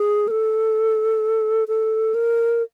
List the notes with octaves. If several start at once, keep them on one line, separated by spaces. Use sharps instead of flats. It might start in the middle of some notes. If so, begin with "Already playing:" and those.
Already playing: G#4
A#4
A4
A4
A#4